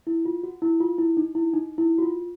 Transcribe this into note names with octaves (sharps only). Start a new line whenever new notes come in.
E4
F4
F#4
E4
F4
E4
D#4
E4
D#4
E4
F#4
F4